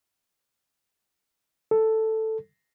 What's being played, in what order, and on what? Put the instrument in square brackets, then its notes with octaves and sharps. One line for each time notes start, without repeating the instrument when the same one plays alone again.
[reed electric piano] A4